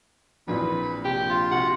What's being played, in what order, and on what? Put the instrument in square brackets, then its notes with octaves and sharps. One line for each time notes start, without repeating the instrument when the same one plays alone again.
[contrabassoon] A#1 [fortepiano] F2 A#2 E3 [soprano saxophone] B4
[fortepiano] C3 [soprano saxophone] G4
[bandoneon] F4
[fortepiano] C3 F#4 [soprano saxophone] F#5